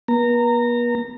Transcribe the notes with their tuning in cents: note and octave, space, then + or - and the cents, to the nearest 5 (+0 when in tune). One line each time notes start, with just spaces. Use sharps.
B3 -45 A#5 -20